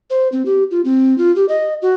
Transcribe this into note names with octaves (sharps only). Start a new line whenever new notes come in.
C5
C4
G4
F4
C4
F4
G4
D#5
F#4